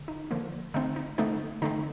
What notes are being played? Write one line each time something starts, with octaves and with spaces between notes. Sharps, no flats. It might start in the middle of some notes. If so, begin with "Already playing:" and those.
Already playing: D3
D#4
D3 F3 A#3
D3 A3 C4 D#4
D#4
D3 A3 C4 D#4
D3 A3 C4 D#4